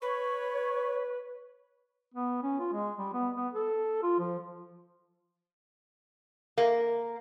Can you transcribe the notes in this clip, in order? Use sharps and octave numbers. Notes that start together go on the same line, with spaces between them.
B4 C#5 C#6
B3
C#4
F4
G#3
G3
B3
B3
A4
F4
F3
A#3